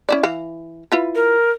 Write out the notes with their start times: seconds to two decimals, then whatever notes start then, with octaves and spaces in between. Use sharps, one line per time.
0.09 C#4 E4 D5
0.23 E3 F5
0.92 E4 F4 B4
1.15 A#4